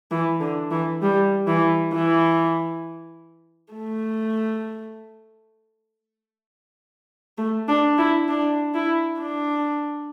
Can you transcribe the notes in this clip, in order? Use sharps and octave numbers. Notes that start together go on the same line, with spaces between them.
E3
D3
E3
G3
E3
E3
A3
A3
D4
E4
D4
E4
D4